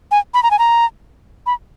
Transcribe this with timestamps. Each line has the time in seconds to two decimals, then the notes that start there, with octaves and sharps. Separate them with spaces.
0.11 G#5
0.34 B5
0.43 A#5
0.51 G#5
0.59 A#5
1.46 B5